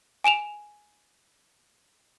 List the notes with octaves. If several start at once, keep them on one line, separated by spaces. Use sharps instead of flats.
G#5 D7 E7 F7